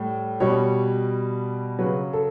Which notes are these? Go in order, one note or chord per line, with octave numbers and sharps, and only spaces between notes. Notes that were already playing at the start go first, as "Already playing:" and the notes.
Already playing: A2 G3
B2 G3 C#5
C#3 F#3 B4
A4